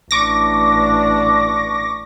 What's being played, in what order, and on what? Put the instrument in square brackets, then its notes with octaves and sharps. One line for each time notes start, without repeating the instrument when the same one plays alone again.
[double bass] A1 D4 [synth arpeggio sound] C#6 D6 A#6